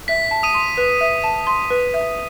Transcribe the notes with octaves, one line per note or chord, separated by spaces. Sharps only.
E5 B6
A5
D#6 D#7
C6
B4
E5
A5
C6
B4
E5